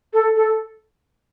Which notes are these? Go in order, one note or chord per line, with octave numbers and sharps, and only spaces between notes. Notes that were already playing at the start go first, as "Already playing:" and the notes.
A4
A4